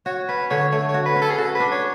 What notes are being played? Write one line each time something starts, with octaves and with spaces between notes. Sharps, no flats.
F#4 C#5
C#4 B4
D3 C#5
A3 C#5
C#5
F#4
B4
C#4
A4
G#4
F#4 A4
B4
D4
C#5